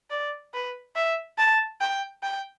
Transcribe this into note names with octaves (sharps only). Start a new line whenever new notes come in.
D5
B4
E5
A5
G5
G5